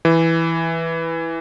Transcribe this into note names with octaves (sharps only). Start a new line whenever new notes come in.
E3